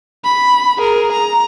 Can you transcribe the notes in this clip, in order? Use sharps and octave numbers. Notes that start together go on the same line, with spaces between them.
B5
G#4 A#4
A#5